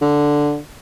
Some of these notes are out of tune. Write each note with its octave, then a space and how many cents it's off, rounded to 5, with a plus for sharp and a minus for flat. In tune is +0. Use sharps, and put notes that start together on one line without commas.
D3 +0